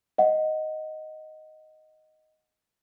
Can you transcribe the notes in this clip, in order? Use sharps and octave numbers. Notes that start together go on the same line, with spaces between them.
D#5 F#5